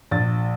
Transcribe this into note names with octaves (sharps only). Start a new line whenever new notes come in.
A#1 A6